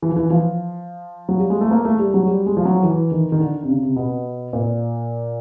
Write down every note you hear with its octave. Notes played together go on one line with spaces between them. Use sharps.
E3
F3
E3
F3
F#3
G3
G#3
A3
A#3
A3
G3
F#3
G3
G#3
F3
F#3
E3
D#3
D#3
D3
C3
C#3
C3
B2
A#2